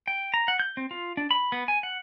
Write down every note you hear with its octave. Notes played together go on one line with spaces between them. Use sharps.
G5
A#5
F#5
G6
C4
F4
D4
B5
B3
G#5
F#5